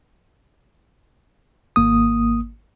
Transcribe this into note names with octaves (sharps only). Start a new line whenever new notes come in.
G#1 A#3 D#6